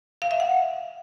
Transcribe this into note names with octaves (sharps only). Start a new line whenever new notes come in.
F5
E5
F#5